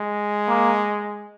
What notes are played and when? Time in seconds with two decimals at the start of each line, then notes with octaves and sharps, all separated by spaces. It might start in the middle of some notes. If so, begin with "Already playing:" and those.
Already playing: G#3
0.48 A#3